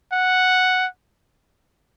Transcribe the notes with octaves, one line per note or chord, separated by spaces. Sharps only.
F#5